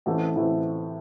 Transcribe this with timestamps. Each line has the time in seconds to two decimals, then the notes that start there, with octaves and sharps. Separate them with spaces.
0.06 A1 A2 E3 A3 C4
0.35 A1 A2 E3 A3 C4